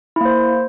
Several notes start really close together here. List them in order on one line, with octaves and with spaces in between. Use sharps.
E4 A#3 C5